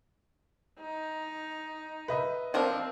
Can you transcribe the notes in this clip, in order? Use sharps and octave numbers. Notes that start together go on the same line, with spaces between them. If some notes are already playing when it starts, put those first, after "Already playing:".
D#4
B4 D#5 E5
F3 C4 D4 A#4